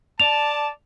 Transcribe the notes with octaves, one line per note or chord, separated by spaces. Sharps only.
D5 A5 F7